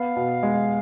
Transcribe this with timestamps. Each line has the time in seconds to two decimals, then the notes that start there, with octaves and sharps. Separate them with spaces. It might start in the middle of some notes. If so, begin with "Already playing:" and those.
Already playing: B3 F5
0.16 B2
0.43 G#3